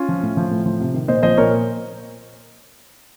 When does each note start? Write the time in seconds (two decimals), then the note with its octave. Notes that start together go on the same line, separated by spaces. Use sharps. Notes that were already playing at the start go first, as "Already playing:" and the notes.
Already playing: C#4 F4
0.09 F3
0.23 A2
0.37 F3
0.51 A2
0.66 F3
0.80 C3
0.94 D#3
1.08 A#2 C5 D#5
1.23 F3 C5 D#5
1.37 A#2 A#4 C#5